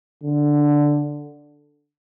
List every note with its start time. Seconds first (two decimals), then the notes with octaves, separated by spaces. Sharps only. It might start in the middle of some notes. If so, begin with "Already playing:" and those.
0.24 D3